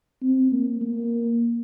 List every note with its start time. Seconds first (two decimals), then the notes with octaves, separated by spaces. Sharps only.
0.22 C4
0.52 A#3
0.81 A#3